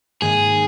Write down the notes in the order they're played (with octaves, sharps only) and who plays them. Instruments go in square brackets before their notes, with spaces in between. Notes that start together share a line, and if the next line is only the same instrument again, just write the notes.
[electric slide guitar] G#2 D#3 A#3 D#4 [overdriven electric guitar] G#4